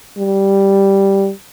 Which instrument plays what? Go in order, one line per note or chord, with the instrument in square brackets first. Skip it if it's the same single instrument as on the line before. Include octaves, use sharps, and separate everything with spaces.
[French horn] G3